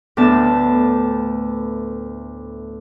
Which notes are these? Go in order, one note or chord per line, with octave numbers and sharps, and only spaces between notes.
D2 A2 B3 A5